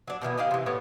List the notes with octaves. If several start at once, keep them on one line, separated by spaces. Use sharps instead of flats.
F#3 D4
B2 D#3 E3 B3
D#4 G4 G#4 F5
C3 E3
A2 B3 C#5